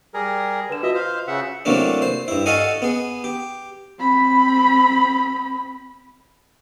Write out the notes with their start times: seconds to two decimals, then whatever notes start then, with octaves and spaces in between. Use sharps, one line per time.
0.14 G3 G#4 A#4
0.70 D3 B4 E7
0.83 F4 F#4 B4 D#5 E5
0.95 C5 F5
1.28 C#3 E5 F#5
1.65 C3 E3 F#3 A3 A#3 D4
2.02 C5
2.28 G2 E4
2.46 F#4 A4 D#5 F5 F#5 G#5
2.82 B3 G#4
3.24 G4
4.00 C4 B5